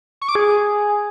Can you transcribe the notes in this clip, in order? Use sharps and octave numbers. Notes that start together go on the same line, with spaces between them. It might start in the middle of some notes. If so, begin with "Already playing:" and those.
C#6
D6
G#4